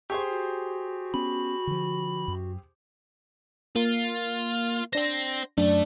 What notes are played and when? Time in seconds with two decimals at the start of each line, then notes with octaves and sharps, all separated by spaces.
0.10 G4 G#4 C5 C#6
0.30 F#4
1.14 B3 C#4 B5
1.67 D3 F3
2.28 F#2
3.76 A#3 F4
4.93 D4 C5 G5 A#6
5.58 F#2 A3 D4